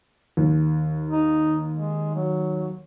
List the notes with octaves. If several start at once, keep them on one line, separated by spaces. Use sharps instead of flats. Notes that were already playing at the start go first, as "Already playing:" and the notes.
D#2
D#4
G#3
F#3